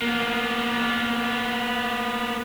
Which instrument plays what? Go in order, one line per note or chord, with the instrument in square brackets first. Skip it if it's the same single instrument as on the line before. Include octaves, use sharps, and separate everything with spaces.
[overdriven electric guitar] A#3 B3